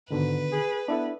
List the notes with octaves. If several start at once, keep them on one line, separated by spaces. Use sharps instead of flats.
G#2 B2 D3 D#3 B4
G#4
B3 D4 E4 A4